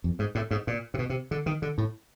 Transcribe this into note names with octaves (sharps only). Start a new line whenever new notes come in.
F2
G#2
A2
G#2
A#2
C3
B2
C3
D3
D#3
D3
A2